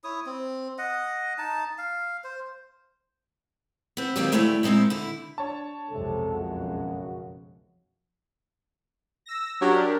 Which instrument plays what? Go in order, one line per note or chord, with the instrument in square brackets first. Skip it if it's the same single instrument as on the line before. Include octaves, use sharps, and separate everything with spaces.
[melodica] E4 C#5 D#6
C4
D#5 F#5
D#4 A5
F5
C5
[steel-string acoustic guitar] B3 C4
D#3 F#3 A#3 C4 D4 G4
D2 A3 E4 C#5 D5 G5
A#2 G#3 C4 D#4 E4
D3 E4
[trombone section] D4 [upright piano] C#5 A5
[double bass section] B1 F2 G#3 [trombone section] C3 A4
[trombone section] F#2 C#3 F#4
[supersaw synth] E6 A#6
[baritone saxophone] F#3 [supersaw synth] D4 G4 A#4